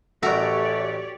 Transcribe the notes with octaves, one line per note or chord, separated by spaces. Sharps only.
A1 A3 F#4 G4 A#4 C#5 D5 E5